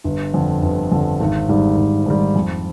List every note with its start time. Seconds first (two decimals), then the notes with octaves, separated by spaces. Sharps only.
0.04 G1
0.34 F2 D3
0.62 G1
0.92 F2 D3
1.21 G#1
1.49 G#2 D#3 G3
1.77 G#1
2.06 G#2 D#3 G3
2.36 F2